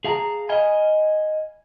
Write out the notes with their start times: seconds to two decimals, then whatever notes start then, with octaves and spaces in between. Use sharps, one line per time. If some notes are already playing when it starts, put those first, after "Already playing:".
0.04 G#4 F5 A5 A#5
0.49 D#5 F5 G#5 B5